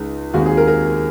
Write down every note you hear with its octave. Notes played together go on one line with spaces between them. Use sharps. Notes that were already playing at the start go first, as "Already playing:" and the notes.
Already playing: C#2 C#3 G#3 D#4
D#2 D#3 G#3 C4 D#4 F#4
G#4
A#4
A#4